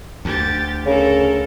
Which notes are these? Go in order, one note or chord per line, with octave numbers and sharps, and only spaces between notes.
D2 G4 A6
C#3 A4 A#4